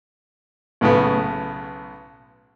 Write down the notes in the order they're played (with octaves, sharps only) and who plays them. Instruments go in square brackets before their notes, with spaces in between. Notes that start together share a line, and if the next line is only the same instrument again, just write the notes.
[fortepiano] B1 A2 C#3 B3